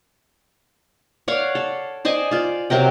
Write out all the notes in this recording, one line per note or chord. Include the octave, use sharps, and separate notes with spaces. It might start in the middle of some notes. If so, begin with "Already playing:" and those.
C#5 D5 F5 F#5
A4
C5 D5 D#5 G#5
F4 D5
C3 F#3 A#4 G5